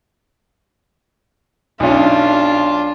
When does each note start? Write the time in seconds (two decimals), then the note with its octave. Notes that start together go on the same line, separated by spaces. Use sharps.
1.80 B1 C#4 D4 F4